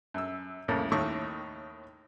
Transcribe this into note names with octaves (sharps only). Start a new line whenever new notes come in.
F#2 E6
C2 F2 A2 C#3 A#3
D#2 A2 D#3 C#6